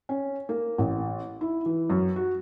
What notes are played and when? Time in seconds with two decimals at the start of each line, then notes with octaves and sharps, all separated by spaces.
0.09 C#4
0.49 A#3
0.78 A1
1.41 E4
1.66 E3
1.90 F#2
2.16 F#4